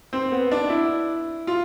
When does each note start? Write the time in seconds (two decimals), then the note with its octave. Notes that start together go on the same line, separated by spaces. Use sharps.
0.13 C4
0.32 B3
0.52 D4
0.70 E4
1.47 F4